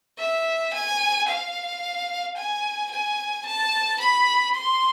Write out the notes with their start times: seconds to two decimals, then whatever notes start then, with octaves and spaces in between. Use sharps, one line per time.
0.19 E5
0.73 G#5
1.28 F5
2.37 G#5
2.91 G#5
3.45 A5
4.00 B5
4.55 C6